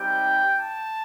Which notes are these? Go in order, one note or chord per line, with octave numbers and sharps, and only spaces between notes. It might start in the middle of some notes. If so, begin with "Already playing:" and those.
Already playing: G3 C4 D#4 G4 G5
A5